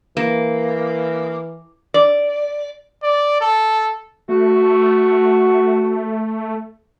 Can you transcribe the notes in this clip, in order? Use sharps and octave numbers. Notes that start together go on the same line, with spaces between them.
E3 A#3
D5
D5
A4
A3 F#4